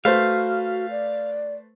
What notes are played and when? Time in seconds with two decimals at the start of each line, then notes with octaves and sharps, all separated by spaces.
0.05 A3 F#4 B4 C5 F5
0.91 D5